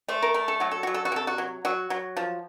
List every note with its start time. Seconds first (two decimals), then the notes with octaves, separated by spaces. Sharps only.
0.08 A3 C5
0.22 A#4
0.34 A3 A#4
0.48 A4
0.60 F#3 F#4
0.71 A4
0.83 F#3 F#4
0.94 A4
1.05 F#4
1.12 C3 A4
1.27 F#4
1.38 F#3
1.65 F#3 F#4
1.90 F#3
2.17 F3